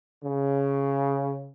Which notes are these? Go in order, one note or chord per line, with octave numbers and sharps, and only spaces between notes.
C#3